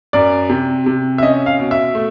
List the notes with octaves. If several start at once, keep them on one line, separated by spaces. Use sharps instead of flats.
F#2 D5
C3
C3
E5
C#4 D#5
F5
B2
E5
A3